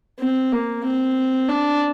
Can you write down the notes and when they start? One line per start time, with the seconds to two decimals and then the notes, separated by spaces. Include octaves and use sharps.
0.19 C4
0.52 A#3
0.84 C4
1.48 D4